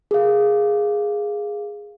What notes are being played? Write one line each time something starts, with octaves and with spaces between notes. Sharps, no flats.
G#4 A#4 F5